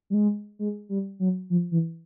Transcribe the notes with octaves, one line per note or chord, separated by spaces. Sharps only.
G3
G#3
G#3
G3
F#3
F3
E3